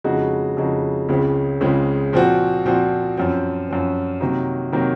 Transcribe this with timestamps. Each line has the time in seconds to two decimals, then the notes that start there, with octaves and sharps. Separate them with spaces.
0.04 F2 C#3 G#3 D#4 F#4
0.57 F2 C#3 G#3 D#4 F#4
1.09 C#2 C#3 G#3 C4
1.61 C#2 C#3 G#3 C4
2.13 A#2 F3 C4 F#4
2.65 A#2 F3 C4 F#4
3.17 F#2 F3 C4
3.68 F#2 F3 C4
4.21 C3 D#3 F#3 A#3
4.72 C3 D#3 F#3 A#3